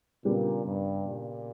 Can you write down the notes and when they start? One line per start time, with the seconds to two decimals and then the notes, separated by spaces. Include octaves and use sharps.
0.25 A#2 C#3 G3 B3 D4 G4
0.65 G2
1.04 A#2